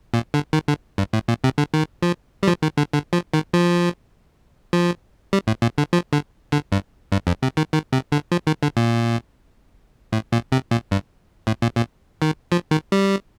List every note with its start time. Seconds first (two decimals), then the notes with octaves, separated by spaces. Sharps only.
0.14 A#2
0.34 D3
0.53 D#3
0.68 D3
0.98 G2
1.13 A2
1.28 A#2
1.44 C3
1.58 D3
1.74 D#3
2.03 F3
2.43 G3
2.48 F3
2.62 D#3
2.77 D3
2.93 D3
3.13 F3
3.34 D#3
3.54 F3
4.73 F3
5.33 G3
5.47 A2
5.62 A#2
5.78 D3
5.93 F3
6.13 D3
6.52 D3
6.72 G2
7.12 G2
7.27 F2
7.43 C3
7.57 D#3
7.72 D#3
7.93 C3
8.12 D3
8.32 F3
8.47 D#3
8.63 D3
8.77 A#2
10.13 A2
10.32 A#2
10.52 C3
10.71 A#2
10.91 G2
11.47 A2
11.62 A#2
11.77 A#2
12.22 D#3
12.52 F3
12.71 D#3
12.92 G3